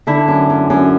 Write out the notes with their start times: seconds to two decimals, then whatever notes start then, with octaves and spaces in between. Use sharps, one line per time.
0.07 D3 E4
0.28 F#2
0.50 F#2
0.70 F#2